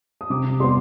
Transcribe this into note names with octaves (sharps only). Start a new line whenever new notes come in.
D#6
C3 D6
G3 B3 C6